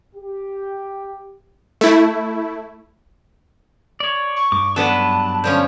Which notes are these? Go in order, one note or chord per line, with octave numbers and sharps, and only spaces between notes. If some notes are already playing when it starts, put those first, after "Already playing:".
G4
A3 E4
C#5 D5
C#6
G2 D6
F#3 G3 B3 D4 A4 B4 A5
D3 F3 C#4 G6